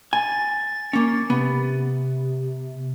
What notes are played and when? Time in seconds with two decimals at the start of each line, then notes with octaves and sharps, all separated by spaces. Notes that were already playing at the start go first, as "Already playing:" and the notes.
0.13 G#5 A6
0.93 A#3 C#4
1.30 C3 B3